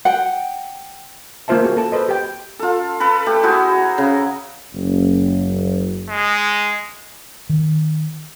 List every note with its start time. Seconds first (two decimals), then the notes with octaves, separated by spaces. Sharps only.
0.05 F#5 G5
1.48 A#3 D#4 F4 C5 E5 A5
1.64 A#3 F#4 G#4
1.77 A4 A5
1.92 A4 B4 C5 D#5
2.09 G4 G5
2.59 F4 A4
3.00 A4 B4 B5
3.26 A3 G4
3.43 E4 F#4 G#4 C5
3.78 A#5
3.98 C#3
4.73 F#1
6.09 G#3
7.49 D#3